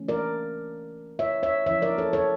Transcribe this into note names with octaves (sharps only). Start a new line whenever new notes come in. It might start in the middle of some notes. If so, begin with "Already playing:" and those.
Already playing: E3 A3 C#4
A#4 D5
C#5 E5
C#5 E5
F3 C#4 E4 C#5 E5
A#4 D5
A4 C#5
A4 C#5